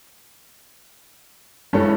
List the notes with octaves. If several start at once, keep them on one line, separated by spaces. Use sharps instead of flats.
G2 G3 G#3 C#4 E4 A4